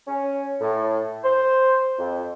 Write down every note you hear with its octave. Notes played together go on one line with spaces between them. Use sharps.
C#4
A2
C5
F2